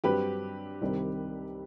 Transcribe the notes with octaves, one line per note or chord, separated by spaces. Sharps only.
G2 F#3 C4 G4 B4
C2 C3 D#3 G3 C4